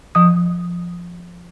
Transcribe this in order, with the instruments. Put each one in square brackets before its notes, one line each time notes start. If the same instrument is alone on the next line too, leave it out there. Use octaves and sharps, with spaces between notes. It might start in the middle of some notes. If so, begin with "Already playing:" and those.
[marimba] F3 D#6